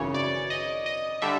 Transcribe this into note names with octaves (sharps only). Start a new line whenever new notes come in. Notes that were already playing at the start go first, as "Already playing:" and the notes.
Already playing: G#1 F#2 C#3 E3 C#5
D5
D#5
D#5
D3 G3 E5